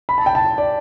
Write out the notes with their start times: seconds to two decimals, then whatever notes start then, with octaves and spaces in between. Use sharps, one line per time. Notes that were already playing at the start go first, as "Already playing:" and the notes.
0.09 B5
0.18 A5
0.26 G5
0.35 A5
0.58 D5